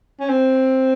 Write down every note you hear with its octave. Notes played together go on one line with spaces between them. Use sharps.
C#4
C4